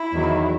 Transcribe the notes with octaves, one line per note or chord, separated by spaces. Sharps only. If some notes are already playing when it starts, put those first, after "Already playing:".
Already playing: E4
E2 D#3 F#3